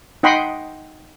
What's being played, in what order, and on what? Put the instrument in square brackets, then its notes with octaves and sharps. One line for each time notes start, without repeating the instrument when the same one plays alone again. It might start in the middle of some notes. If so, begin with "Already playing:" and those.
[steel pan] D#4 D#5 F#5 G5 B5 C6